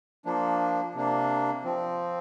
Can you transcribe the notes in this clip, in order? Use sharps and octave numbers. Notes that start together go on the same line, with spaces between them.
F3 A#3 D4
C3 A#3 D4
F3 C4